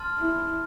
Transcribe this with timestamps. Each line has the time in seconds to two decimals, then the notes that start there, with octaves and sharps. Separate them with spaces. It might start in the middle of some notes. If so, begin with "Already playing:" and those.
Already playing: A5 C6 F6 A6
0.18 E4